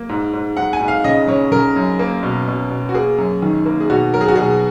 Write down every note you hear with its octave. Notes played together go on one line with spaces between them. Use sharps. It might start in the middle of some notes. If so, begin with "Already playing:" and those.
Already playing: A#3
G#2
G#2
G#2 F#5
G#5
G#2
F5
C#3 D#5
C#3 C#5
C#3 A#4
F#2
A#3
B2
B2
B2
F#4
A#3 G#4
F#2
D#3
A#3
G#4
B2 F#4
F#3 A#4
G#4
F#4
B2 G#4